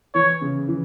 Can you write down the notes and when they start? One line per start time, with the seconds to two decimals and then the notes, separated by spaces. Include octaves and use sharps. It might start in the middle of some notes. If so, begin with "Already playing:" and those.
0.15 E3 C#5
0.41 C#3
0.68 E3